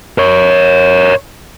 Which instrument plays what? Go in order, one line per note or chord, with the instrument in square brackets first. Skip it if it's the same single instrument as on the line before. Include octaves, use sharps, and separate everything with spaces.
[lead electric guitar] A#4 C#5